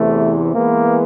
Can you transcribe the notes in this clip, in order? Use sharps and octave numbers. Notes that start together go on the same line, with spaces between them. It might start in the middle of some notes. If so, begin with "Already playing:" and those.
Already playing: E2 C3 E3 A3
E3 G#3 A#3 B3